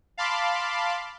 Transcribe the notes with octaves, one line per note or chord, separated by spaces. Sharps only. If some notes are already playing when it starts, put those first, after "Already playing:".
F5 A5 B5 C6 D6